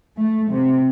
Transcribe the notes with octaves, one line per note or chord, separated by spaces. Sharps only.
A3
C3